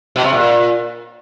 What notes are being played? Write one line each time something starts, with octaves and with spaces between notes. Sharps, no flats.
B2
C3
A#2